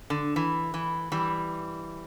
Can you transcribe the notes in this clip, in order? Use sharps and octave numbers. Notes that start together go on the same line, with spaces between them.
D3
E3
E3
E3 G3